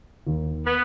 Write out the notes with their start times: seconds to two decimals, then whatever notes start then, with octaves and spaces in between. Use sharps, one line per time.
0.27 D#2
0.66 B3